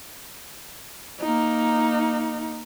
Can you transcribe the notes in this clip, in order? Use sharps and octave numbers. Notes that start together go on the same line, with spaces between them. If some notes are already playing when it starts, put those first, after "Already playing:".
A#3 D#4